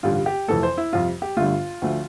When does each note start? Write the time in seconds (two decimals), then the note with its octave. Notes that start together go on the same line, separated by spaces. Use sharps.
0.03 A1 G2 D3 G3 F4
0.26 G4
0.48 F1 F2 E3 A3 A4
0.63 C5
0.77 E4
0.92 F2 C3 G3 F4
1.22 G4
1.37 G1 G2 D3 A3 F4
1.82 D2 D3 F3 A3